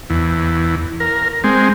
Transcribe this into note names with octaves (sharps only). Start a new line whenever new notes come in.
E2
A#4
G#3 C4